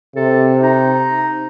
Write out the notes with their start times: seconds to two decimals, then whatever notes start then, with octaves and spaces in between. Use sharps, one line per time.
0.16 C3 A4
0.61 D#4